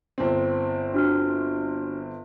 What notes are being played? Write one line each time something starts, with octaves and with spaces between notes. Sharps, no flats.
G1 C4
D4 F#4 F6